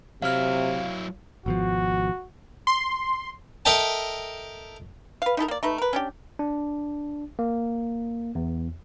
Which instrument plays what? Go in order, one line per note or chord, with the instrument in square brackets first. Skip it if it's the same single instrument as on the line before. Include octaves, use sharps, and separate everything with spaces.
[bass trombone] C3 [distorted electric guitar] F#3 E4 [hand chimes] F5 F6
[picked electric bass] G#1 B2 F3 [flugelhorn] F#4
[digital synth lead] C6
[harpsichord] A4 A#4 D#5 E5 G5 A5
[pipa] B4 F5
D#4 E4 A4 A#4
A#3 D5
A3 D#4 B4
A#4 B4
C#4 D4 G4
[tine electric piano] D4
A#3
E2